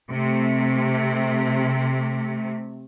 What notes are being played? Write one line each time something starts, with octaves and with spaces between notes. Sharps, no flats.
C3 A3